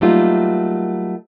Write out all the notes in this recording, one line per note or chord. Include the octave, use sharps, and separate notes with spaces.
F#3 G3 A3 A#3 D#4 F4